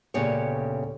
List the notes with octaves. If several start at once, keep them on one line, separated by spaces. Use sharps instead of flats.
D2 A#2 C#3 B3 G4 C#5